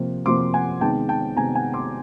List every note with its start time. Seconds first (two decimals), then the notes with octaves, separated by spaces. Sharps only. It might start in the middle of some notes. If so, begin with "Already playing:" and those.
Already playing: C3 F3 A#3
0.26 C3 F3 A#3 C6 D6
0.54 F#5 G#5
0.81 C3 D#3 G#3 B3 G5 A5
1.09 G5 A5
1.36 C3 D#3 G#3 B3 G#5 A#5
1.55 F#5 G#5
1.73 C6 D6